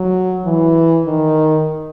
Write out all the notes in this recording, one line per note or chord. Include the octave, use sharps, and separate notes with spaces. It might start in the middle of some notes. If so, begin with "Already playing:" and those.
Already playing: F#3
E3
D#3